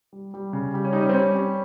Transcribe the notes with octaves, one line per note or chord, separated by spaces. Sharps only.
G3
G3
C#3
G3
C#4
G3 D#4
C#4
C4
G3 C#4
G3